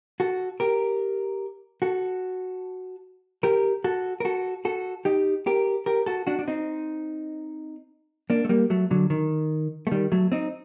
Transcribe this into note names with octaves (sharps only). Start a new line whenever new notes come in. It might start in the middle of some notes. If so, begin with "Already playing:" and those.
F#4 A4
G4 A#4
F#4 A4
G4 A#4
F#4 A4
A#4
F#4 A4
F#4 A4
D#4 G4
G4 A#4
G4 A#4
F#4 A4
D4 F#4
D4
C4 D#4
A#3 D4
A3
G3 A#3
F#3 A3
D3 F#3
D#3
A3
D#3 G3
F#3 A3
C4 D#4